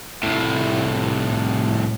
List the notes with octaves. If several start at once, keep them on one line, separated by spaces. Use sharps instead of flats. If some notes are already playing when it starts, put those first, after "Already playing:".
C2 A2